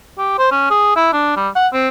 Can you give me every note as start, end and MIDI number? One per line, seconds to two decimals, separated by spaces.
0.19 0.36 67
0.38 0.49 72
0.51 0.68 61
0.70 0.91 68
0.96 1.08 64
1.13 1.35 62
1.37 1.49 55
1.56 1.68 78
1.73 1.88 60